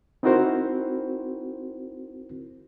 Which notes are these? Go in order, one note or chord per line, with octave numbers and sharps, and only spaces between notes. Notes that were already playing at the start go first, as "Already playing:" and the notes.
C4 D#4 E4 F#4 A#4 C5